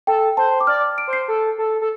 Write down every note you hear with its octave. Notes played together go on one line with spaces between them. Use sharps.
A4 G5
C5 A5
D6
D5 F6
D7
C5
C7
A4
A4
A4